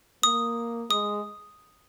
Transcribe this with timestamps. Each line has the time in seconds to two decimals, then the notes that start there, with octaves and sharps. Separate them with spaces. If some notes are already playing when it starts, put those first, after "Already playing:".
0.23 A#3 D#6
0.91 G#3 D#6